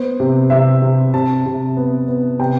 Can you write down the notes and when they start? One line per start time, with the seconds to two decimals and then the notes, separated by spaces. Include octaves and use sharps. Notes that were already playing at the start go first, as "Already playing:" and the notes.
Already playing: B3 C5
0.20 C3
0.50 C3 E5
0.82 C3
1.14 C3 A5
1.46 C3
1.77 B3
2.08 B3
2.39 C3 G5